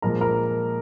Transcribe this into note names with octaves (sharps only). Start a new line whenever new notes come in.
A#2 F3 G#3 A#4 A#5
A#4 A#5